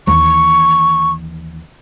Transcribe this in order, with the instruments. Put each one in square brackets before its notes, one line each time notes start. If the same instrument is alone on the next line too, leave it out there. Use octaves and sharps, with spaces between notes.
[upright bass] D#2 E3 [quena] C#6